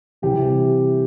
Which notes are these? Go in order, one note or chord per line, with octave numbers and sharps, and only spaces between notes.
C3 E3 G3 G4